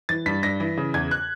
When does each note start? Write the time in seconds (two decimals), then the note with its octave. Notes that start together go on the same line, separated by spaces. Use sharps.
0.09 E3 A6
0.26 G2 B6
0.43 G2 A#6
0.60 E3
0.77 C#3
0.94 E2 G#6
1.11 F#6